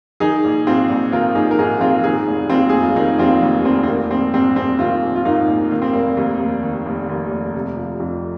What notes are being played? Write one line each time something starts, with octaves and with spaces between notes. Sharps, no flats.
D#3 D#4 G#4
A#1
G#2 C4 F4
A#1
D#3 F4 A#4
A#1 D#4 G#4
A#4
G#2 D#4 G#4
A#1 C4 F4
D#3 D#4 G#4
F1
D#2 C4 F4
F1 G#4
F4
D#3 A#3 D#4
F1 C4 F4
D#2
F1 C4
C4
D#3 A#3
A#1 C4
G#2 C4
A#1 C4
D#3 C4 F4
A#1
F4
G#2 A#3 D#4
A#1
D#3 A#3
C4
F1 A#3
D#2
F1
D#3
F1
D#2
F1
C3
F3
F2